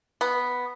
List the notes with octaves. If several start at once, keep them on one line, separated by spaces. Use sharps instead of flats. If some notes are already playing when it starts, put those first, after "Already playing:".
B3